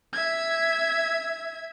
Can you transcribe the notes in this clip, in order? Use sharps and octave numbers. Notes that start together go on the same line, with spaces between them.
E5 G#6